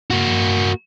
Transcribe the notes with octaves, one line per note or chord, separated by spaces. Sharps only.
A#3 F#4